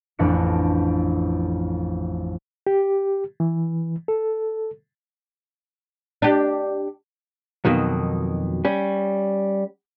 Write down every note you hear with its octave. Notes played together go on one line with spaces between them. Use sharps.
A1 F2 D4 B4 A#6 C#7
G4
E3
A4
D4 G4
F2 B2 D#3 F#3
G3 C#4